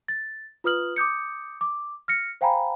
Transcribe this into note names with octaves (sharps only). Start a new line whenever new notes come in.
A6
F4 B4 D#6 F6 F#7
D6 D#6 G6 C#7
D6
F6 A#6 C#7
C5 F5 G5 G#5 A#5 B5